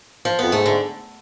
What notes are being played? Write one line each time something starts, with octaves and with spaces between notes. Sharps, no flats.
F3
F2 B3
G#2 A3
D3